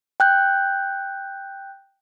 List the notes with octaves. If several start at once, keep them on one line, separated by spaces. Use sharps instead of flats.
G5 F#6 G6